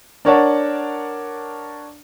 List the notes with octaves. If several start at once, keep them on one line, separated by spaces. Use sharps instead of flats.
D4 A#4 C#5 D5 F#5 A5